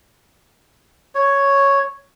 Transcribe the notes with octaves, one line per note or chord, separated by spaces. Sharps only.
C#5